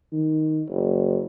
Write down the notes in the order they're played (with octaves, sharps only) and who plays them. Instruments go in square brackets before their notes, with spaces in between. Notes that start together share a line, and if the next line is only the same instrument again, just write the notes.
[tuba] D#3
F#1